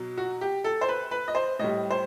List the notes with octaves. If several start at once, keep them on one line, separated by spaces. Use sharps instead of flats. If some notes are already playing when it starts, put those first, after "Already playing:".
Already playing: B2 F#3
F#4
G4
A4
C5
B4
B4
D#5
C5
A2 G3 D#5
C5